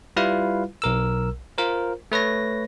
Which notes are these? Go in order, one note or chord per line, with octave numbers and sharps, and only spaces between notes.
G3 E4 F4 B4 F5
B1 A#4 E6
F4 A#4 C5
A3 B4 C#5 A#6